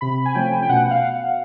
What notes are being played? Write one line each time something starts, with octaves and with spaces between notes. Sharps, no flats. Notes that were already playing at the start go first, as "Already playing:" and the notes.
C3 B5
G#5
F3 A3 C#4 G5
G5
B2 F#5
F5